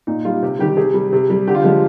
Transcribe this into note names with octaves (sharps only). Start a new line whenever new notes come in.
A#2 D#4
G3 F4
C3 G4
D#3 G3 G4
C3 G#4
G3
C3
G3
D3 G4
F4
F3 G#3 G4